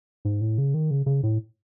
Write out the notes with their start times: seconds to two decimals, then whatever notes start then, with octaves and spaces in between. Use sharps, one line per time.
0.25 G#2
0.41 A2
0.58 C#3
0.74 D#3
0.91 C#3
1.06 C#3
1.23 A2